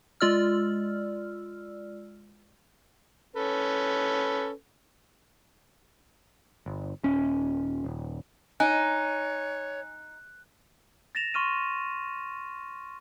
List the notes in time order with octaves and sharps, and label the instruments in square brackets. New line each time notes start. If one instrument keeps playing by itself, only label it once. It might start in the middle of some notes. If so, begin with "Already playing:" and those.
[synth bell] G#3 F4 D5 E6 F6
[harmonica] C#4 A4 B4
[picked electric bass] G1
D#1 C#4
D#1
[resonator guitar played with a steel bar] D#4 [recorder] C#5 [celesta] G#5 [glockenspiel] F#6
[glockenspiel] A6 A#6 E7 F7
C6 C#6 F6 D#7